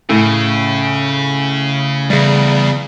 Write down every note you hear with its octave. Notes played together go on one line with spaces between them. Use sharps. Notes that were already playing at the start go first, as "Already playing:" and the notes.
A2 C#3
E2 C#3 G3